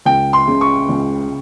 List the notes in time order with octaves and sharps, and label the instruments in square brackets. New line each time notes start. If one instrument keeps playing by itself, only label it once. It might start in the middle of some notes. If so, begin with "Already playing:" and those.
[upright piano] C#2 [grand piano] G5
[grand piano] C6
[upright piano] C#3
[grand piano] C#6
[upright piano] C#2